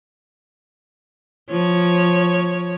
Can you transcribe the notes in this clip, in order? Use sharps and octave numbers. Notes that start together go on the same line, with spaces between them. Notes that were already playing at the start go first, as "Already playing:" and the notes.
F3 C#5